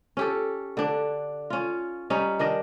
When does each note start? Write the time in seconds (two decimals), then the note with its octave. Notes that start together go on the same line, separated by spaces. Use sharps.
0.17 C#4 G4 A4
0.77 D3 D4
1.50 C#4 F4
2.10 G3 C#4 D#4
2.39 D#3 D4 D#5